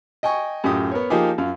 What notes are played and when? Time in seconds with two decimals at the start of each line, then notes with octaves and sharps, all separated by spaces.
0.23 D#5 G5 G#5 C#6
0.64 F#2 A2 F4 G4 D#6
0.91 B3 A#4 C#5
1.10 F3 A#3 D#4 F4 G4 G#4
1.38 F#2 F4 F5